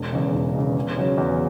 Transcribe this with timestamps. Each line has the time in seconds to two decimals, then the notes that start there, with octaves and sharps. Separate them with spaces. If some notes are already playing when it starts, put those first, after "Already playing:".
Already playing: E1
0.12 E2 C#3
0.34 E1
0.55 E2 C#3
0.76 E2
0.97 C#3 F#3 C#4
1.18 E2